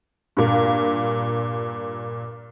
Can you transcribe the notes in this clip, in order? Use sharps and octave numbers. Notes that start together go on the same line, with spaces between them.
G2 A#2